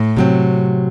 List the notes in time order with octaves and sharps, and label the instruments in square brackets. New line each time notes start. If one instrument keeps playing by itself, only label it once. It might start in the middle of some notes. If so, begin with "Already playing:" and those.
Already playing: [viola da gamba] A2
[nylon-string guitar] C3 F#3 C4